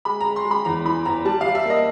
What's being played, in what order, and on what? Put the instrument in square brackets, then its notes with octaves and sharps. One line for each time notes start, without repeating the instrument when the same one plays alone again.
[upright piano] G#3 B5
A#5
G#3
C6
G#3
B5
E2 A#5
E3 B5
E2 A#5
G3 A5
G3 F5
E5
A#3
D#5